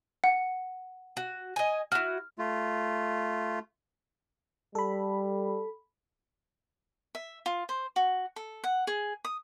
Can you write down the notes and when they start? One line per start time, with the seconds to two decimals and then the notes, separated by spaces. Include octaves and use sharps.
0.24 F#5
1.17 F#4
1.56 D#5 G#5
1.92 E4 F#4 F6
2.39 A3 F4
4.75 G3 A4 B5
7.15 E5
7.46 F4
7.69 C5
7.96 F#4
8.36 A4
8.64 F#5
8.87 G#4
9.25 D#6